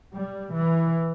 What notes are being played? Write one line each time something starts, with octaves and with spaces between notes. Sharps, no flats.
G3
E3